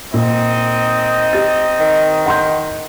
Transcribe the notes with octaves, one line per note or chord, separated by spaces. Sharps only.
A#2 C4 D#4 D#5
G4 A6
D#3
F#5 C6 G6